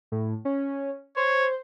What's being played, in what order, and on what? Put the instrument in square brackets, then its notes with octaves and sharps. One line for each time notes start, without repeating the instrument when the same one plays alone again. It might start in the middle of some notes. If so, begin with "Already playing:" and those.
[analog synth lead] A2
C#4
[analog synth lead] C5 [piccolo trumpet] C#5